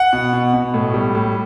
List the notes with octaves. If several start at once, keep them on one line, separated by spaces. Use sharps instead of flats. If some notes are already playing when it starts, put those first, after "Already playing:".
Already playing: F#5
B2
B2
B2
A2
G3
A2